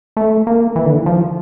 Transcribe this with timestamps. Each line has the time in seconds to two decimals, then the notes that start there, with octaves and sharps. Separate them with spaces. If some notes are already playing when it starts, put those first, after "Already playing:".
0.17 A3
0.47 A#3
0.76 E3
0.86 D3
0.96 E3
1.06 F3